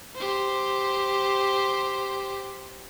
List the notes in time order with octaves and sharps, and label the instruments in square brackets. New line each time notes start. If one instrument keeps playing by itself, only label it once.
[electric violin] G4 C5